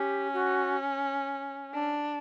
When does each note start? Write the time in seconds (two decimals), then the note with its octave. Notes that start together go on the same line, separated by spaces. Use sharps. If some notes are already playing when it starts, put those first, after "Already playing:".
Already playing: C#4 G4
0.33 F#4
1.74 D4